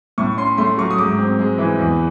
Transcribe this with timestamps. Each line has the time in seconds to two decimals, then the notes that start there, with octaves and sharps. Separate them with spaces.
0.18 A2 C#6
0.37 C#4 C6
0.58 A3 C6
0.78 F#3 C#6
0.90 D#6
0.98 G#2 D6
1.18 C4
1.39 G#3
1.58 E3
1.79 E2